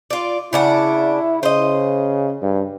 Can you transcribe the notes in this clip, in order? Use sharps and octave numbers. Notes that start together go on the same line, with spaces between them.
F4 D5
C#3 D4 E4 F#5
C#3 C5 D#5
G2